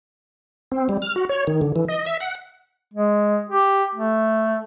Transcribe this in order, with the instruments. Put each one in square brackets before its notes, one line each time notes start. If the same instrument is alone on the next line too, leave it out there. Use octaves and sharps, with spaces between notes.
[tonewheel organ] C4
G3
F6
F#4
C#5
D#3
D3
E3
D#5
E5
F#5
[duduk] G#3
G4
A3